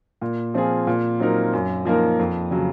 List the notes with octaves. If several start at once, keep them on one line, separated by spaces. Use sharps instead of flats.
A#2
F3 C4 F4 G#4
A#2
F#3 C4 D#4 A#4
F#2
F3 A#3 D#4 A#4
F2
C#3 F#3